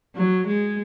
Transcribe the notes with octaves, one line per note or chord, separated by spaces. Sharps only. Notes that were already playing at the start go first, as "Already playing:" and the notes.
F#3
G#3